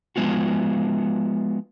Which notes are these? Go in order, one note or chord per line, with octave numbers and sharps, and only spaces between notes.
F3 G#3 B3 F4 F#4